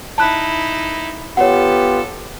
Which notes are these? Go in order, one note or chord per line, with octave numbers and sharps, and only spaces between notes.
D#4 E4 A5 F#6
B3 F4 G4 A4 C#5 F#5